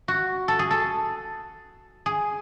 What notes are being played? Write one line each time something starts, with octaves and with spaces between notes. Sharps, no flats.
F#4
A4
G#4
A4
G#4